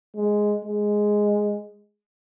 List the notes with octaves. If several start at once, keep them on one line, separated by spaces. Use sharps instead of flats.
G#3
G#3